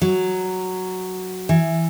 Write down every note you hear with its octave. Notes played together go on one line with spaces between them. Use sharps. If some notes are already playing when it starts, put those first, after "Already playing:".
F#3
E3